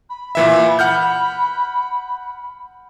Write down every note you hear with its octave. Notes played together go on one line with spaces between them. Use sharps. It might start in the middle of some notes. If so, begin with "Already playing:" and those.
B5
A#2 E3 E5
F#5 F6 G6